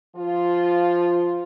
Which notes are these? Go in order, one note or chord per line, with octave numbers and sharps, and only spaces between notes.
F3 F4